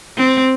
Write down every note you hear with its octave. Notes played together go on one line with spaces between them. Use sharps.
C4